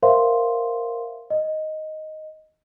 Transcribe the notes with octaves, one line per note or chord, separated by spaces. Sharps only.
A#4 C5 E5 F5 C6
D#5